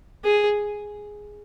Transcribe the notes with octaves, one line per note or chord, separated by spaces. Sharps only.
G#4